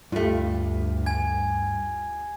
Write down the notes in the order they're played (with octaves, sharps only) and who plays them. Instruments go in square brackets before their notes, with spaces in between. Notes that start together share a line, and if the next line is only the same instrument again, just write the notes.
[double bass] D2 [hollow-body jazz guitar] G2 A3 [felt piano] F4 G4
[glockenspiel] G#5 G#6